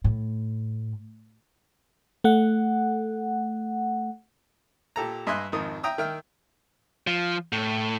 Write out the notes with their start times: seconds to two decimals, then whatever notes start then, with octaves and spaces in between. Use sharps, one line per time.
0.04 A2
2.24 A3 F#5
4.96 A#2 G4 A4 A#5
5.27 G2 D#5 E5 G#5 C6 F#6
5.52 G#1 F2 D#3 D#6
5.83 E5 G5 A#5 D#6 E6
5.98 D#3 E5 G5 F6
7.07 F3
7.53 A2